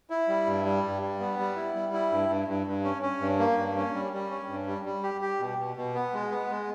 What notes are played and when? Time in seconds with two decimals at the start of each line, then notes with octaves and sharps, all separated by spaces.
0.10 E4
0.28 G3
0.47 G2
0.65 G3
0.84 G2
1.02 G3
1.20 B3
1.39 G3
1.56 E4
1.75 G3
1.93 E4
2.12 G2
2.29 G2
2.48 G2
2.67 G2
2.84 C#4
3.02 C#4
3.20 G2
3.39 A#3
3.57 G2
3.76 C#4
3.94 G3
4.13 G3
4.31 C#4
4.49 G2
4.67 G3
4.85 G3
5.03 G4
5.21 G4
5.40 B2
5.58 B2
5.77 B2
5.94 B3
6.14 G#3
6.31 B3
6.50 G#3